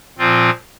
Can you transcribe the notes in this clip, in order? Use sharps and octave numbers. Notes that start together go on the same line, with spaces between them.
A#2 F3 C4 F4